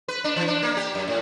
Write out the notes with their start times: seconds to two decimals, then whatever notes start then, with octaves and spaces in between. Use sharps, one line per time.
0.08 B4
0.24 D4
0.36 E3
0.48 D4
0.63 A#3
0.77 G4
0.95 F#2
1.08 A2